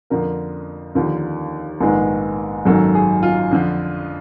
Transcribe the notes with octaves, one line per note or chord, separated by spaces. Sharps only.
F2 D3 F3 A#3 A#4
D#2 D3 F3
A#1 G#2 D#3 G#3 B3
G#1 F#2 D#3 F#3 A#3 A4
G#4
F4
F2 D3 F3